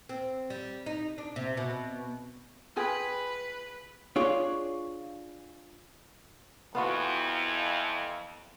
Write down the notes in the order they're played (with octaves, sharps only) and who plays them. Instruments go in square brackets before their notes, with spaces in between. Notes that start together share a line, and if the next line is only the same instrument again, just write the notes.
[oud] C4
G3
D#4
D4
C3
B2
[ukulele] F4 G#4 G5 [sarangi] B4
[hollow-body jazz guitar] D4 F4 G#4 C#5
[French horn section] F2 E3 [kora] B3 F4 F#4